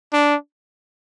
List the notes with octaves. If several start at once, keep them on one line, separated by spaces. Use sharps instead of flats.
D4